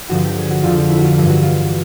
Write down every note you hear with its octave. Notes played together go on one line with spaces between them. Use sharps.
G2 D3 F3 F#4
G4
G#4
F#4
F2 D3 F3 F4
F4
E4
F#4
F4
G2 E3 F4
F#4
F4